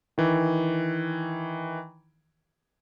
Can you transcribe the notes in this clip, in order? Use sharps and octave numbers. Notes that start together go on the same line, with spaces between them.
D#3 E3